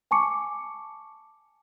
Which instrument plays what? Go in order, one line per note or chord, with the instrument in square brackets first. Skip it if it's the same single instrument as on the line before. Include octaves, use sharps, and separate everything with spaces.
[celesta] G#5 A5 C#6 D6 C#7